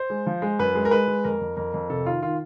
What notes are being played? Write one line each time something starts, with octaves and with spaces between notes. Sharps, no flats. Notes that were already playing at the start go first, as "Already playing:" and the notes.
Already playing: C5
G#3
F3
G#3
F#2 B4
G#3
A#4
G#3 B4
G#3
F2 A#4
F2
F2 A#4
F2
C3 A4
D#3 F4
D#3 F4